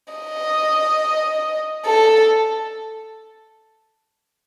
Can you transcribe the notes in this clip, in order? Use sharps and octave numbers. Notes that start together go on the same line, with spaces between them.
D#5
A4